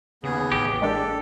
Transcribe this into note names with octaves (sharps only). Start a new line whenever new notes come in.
D#2 C#3 B3 G#4
A1 G4
G#3 A#3 D4 A4